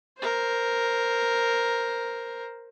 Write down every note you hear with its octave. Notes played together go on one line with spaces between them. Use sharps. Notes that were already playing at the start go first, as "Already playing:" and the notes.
A#4 C5